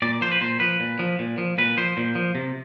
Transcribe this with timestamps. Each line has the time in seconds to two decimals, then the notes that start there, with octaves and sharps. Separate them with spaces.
0.02 A#2 D5
0.21 F3 C5
0.32 B4
0.41 A#2 C5
0.60 F3 B4
0.80 A#2
0.99 F3
1.19 A#2
1.38 F3
1.58 A#2 B4
1.77 F3 C5
1.97 A#2
2.15 F3
2.35 C3